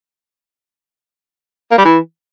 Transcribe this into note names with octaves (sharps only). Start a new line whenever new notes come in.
A#3
G3
E3